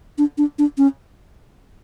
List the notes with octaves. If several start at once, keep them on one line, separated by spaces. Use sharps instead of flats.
D4
D4
D4
C#4